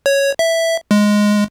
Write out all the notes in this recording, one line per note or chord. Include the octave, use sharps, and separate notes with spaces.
C#5
E5
G#3